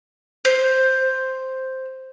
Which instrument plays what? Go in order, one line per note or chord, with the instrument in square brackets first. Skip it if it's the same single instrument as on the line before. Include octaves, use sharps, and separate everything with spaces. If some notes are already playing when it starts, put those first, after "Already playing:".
[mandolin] C5 G6